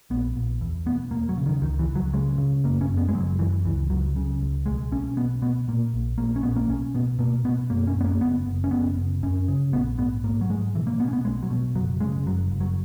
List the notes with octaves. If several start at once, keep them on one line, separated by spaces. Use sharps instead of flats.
A#1 B3
A#1
E2
E1 B3
E1 A#3
F#3
C#3
D#3
C#2 D#3
E3
C#2
F#3
C#3 G#3
C#3
F#1 A#3
C#4
F#2
B3
G#3
F#1 F#3
F#2 E3
C#2 E3
C#2 F#3
C#3
C#2
B1 G#3
B1 C#4
B2 B3
B2 B3
A#2 A#3
A#1
A#1 A#3
C#4
A#1 B3
A#3
B1 C#4
B2 B3
B2 A#3
B2 B3
F#2 A#3
C#4
F#2 B3
A#3
F#1 B3
F#1
C#4
F#1 B3
F#1
F#2 C#4
C#3
A#1 B3
G#2 B3
G#2 A#3
F#3
G#2 G#3
B2 E3
A#3
B2 B3
C#4
B3
B1 G#3
F#3
B2
F#1 F#3
C#3 G#3
F#1 F#3
F#1
F#3